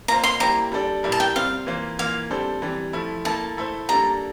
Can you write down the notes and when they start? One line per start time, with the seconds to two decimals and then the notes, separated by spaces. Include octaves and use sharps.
0.08 A#3 F4 C5 A#5
0.24 C6
0.40 G3 A#3 E4 G4 C5 A#5
0.72 G3 D4 A4 D5
1.03 A#2 G3 A#3 E4 A#4
1.12 A5
1.20 G5
1.35 C3 G3 C4 F5
1.67 E3 A#3 F4 C5
1.99 E3 A#3 F4 F5
2.30 C3 G3 D4 A4 C5
2.62 C3 E3 G3
2.93 F3 A3 E4
3.25 A#3 E4 A4 A5
3.57 A3 E4 A4 C5
3.89 G3 A#3 D4 A4 A#5